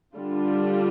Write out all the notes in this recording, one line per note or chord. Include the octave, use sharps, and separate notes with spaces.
D3 G3 D4 F4